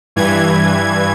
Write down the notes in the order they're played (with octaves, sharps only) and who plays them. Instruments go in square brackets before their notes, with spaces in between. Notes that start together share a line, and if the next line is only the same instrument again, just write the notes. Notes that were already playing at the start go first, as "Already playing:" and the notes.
[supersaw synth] G2 E3 G#6